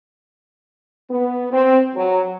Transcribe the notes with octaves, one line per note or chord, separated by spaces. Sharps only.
B3
C4
F#3